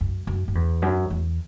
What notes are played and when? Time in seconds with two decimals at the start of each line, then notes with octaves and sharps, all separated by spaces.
0.01 F#2
0.27 F#2
0.48 F#2
0.55 E2
0.82 F#2
1.10 E2